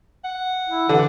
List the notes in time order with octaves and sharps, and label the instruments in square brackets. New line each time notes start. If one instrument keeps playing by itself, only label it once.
[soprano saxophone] F#5
[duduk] E4
[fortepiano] D3 [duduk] E3